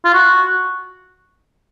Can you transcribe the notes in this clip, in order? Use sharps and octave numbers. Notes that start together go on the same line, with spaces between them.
F4
F#4